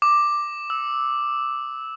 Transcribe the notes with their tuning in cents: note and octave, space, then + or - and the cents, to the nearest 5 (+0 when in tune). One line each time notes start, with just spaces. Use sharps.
D6 +5
E6 -10